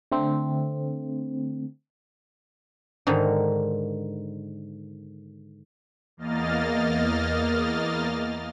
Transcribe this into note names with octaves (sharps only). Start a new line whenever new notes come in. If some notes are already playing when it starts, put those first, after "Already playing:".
D3 A3 C4
G#2 D3 D#3
E2 A#3 D#5 F6 A6